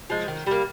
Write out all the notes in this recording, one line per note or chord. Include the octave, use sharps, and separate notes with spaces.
F3 G#3
D#3
G3 A#3